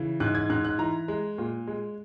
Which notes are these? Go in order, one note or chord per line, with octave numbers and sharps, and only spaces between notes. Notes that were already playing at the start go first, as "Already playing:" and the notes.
Already playing: C#3 E3
G#2 F#6
G#6
G#2 F#6
F#6
E3 A#5
G#3
A#2
G#3